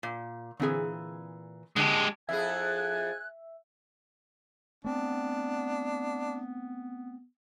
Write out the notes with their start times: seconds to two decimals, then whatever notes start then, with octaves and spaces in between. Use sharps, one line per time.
0.03 A#2
0.60 A#2 D3 E3 C4 G#4
1.76 D3 G#3 G4 A5
2.29 F2 E4 G#4 E5 G#5 F#6
4.84 A3 B3 C4 D4